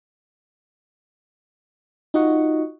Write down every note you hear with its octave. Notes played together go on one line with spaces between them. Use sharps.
D#4 F4 F#4 D#5 F#5 C#6